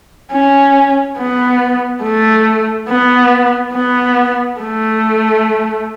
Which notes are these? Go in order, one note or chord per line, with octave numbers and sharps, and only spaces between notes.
C#4
B3
A3
B3
B3
A3